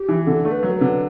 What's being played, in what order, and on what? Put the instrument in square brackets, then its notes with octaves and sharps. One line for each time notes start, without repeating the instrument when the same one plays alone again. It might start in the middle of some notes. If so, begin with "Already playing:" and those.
Already playing: [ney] G4
[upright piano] E3
[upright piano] D3 [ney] A4
[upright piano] A3
[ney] B4
[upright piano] F#3
[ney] A4
B4
[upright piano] D3